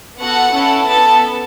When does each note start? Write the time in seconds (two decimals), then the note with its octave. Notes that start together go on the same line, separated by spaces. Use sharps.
0.19 B3 F#4 A4 F#5
0.53 C#4 E4 A4
0.87 B3 A4 A5